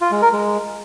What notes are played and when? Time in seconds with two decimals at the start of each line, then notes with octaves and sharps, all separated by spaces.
0.01 F4
0.11 G#3
0.22 A#4
0.32 G#3